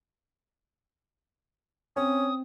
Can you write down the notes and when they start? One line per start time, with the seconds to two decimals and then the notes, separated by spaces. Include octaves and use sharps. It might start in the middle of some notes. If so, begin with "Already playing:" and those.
1.96 C4 C#4 D#6